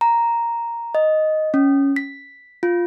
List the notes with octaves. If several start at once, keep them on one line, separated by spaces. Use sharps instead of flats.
A#5
D#5
C#4
B6
F4